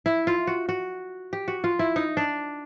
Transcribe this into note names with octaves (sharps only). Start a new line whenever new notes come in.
E4
F4
F#4
F#4
G4
F#4
F4
E4
D#4
D4